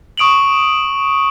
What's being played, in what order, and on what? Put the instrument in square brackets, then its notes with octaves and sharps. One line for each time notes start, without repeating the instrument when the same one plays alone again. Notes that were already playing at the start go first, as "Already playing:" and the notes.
[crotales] C#6 D#6 D7 F7 F#7